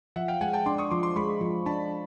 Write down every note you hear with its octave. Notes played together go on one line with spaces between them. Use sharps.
F3 E5 F#5
F5 G5
G#3 F#5 G#5
G5 A5
D4 C6 D6
C#6 D#6
F3 C6 D6
C6 D6
G#3 B5 C#6
F3
D4 A5 B5